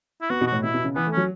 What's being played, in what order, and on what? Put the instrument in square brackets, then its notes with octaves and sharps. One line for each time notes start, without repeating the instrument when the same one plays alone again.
[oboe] E4
[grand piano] B3 [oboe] F#4
[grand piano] B2
[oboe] F#4
[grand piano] A2
[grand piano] B2 [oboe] E4
[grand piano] B2
C#3
[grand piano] E3 [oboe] B3
[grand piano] A3
[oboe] C#4
[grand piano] F#3